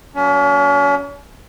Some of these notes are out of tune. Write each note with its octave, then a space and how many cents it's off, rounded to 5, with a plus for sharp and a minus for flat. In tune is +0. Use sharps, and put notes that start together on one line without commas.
F#3 -5 A#3 +0 C#4 +40